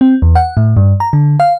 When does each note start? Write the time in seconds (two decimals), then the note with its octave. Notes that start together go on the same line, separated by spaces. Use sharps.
0.01 C4
0.22 E2
0.35 F#5
0.57 A2
0.77 G2
1.00 A#5
1.13 D3
1.40 F5